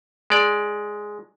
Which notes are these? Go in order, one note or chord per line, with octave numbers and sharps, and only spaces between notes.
G#3 D5